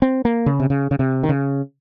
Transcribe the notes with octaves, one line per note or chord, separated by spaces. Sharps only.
C4
A#3
C#3
C3
C#3
C#3
C3
D#3
C#3